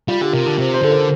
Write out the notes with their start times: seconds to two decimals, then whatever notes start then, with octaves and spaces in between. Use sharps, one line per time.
0.08 G3 F4
0.21 D3 G4
0.33 C3 A#4
0.46 D3
0.58 C3 C5
0.74 C5
0.82 D3 A4
0.91 A#4